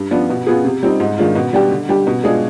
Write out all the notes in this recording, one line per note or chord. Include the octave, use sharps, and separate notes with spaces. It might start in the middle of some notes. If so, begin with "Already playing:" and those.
Already playing: G2
F3 B3 D4 F4
B2
B3 F4 G#4
C3
G3 C4 D#4
G#2
D#3 G#3 D4 F4
B2
G3 D4 G4
D3
G3 D4 G4
B2
G#3 D4 F4 G#4